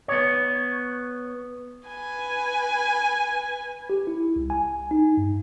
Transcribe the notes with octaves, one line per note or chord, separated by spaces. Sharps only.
B3 C#5
B4 G#5
G4
E4
C2
G#5
D#4
G2